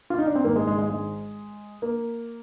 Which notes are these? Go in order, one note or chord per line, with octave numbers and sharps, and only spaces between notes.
F4
D#4
D4
C4
G#1 G#2 D#3 A#3
G#3
G#3
G#3
G#3
A#3